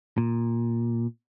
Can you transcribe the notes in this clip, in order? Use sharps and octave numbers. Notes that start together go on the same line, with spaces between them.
A#2